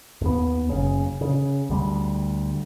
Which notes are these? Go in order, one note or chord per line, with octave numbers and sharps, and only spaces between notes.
D#2 B3
F#1 C#3
C#3
D2 G3